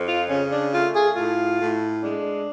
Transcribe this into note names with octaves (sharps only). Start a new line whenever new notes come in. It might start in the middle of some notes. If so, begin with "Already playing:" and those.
Already playing: F2
F4
C#3 C#4
D4
A3 F4
G#4
A2 F4
A2
G#3 D4